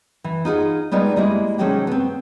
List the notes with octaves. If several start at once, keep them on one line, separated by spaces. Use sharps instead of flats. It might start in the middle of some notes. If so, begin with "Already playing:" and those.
E3
D#4 F4 G#4 F#5
G3 G#3 B3 D#4 F4
G3 G#3 A#3 E4
C3 D#3 F#3 G#3 C#4 A4
B3 C4